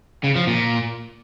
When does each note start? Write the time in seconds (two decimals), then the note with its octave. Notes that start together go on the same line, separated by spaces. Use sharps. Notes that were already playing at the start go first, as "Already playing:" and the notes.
0.24 C#3
0.36 F3
0.47 A#2